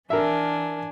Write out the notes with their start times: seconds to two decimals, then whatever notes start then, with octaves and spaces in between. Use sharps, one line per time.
0.10 E3 D4 A#4 E5 G#5